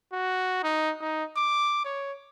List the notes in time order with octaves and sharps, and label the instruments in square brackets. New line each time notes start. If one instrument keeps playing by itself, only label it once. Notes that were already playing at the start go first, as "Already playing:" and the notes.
[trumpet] F#4
D#4
D#4
D6
C#5